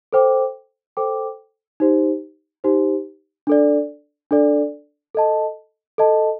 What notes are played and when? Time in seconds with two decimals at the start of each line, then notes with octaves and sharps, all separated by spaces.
0.13 A4 C5 G5 D6
0.97 A4 C5 G5 D6
1.80 D#4 G4 C5
2.64 D#4 G4 C5
3.47 D4 A4 D5
4.31 D4 A4 D5
5.15 A4 D#5 A5
5.98 A4 D#5 A5